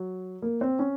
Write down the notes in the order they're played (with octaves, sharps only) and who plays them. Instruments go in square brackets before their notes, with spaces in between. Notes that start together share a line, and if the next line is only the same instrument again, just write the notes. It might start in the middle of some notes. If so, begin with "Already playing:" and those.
Already playing: [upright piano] F#3
A#3
C4
C#4